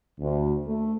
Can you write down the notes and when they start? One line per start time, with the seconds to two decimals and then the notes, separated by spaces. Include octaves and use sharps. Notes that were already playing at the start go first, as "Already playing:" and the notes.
0.20 D2
0.66 A3